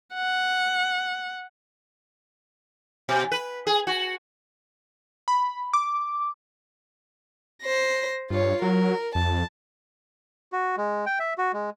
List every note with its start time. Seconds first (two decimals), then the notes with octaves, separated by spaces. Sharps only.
0.14 F#5
3.09 B2
3.32 B4
3.67 G#4
3.87 F#4
5.28 B5
5.73 D6
7.63 C5 A#6
8.30 G2 F4 C#5
8.62 F#3 A#4
9.15 F2 A5
10.52 F#4
10.78 G#3
11.06 G5
11.19 E5
11.38 F#4
11.53 G#3